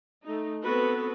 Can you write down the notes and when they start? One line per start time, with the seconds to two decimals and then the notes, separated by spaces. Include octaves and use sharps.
0.24 A3 D#4
0.63 B3 C4 F#4 A4 B4